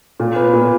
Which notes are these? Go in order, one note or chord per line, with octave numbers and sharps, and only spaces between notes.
A#2
B3
A#2